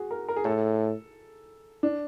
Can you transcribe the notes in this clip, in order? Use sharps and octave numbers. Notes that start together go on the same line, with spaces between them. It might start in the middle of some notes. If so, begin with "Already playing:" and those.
Already playing: F#4 G#4
A#4
A#4
G#4
A2 A4
D4